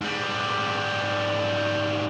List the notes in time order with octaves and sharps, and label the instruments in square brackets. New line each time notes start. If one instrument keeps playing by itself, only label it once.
[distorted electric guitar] G#2 G3